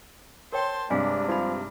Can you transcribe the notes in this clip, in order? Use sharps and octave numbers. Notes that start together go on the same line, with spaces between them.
A#4 C5 C#5 G5 A5 C6
G2 C3 G#3 D4 D#5 F5 G#5
F3 D#4 D5 B5